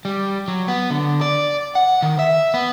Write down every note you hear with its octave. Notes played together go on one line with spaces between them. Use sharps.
G3
F#3
B3
D3
D5
F#5
D#3
E5
B3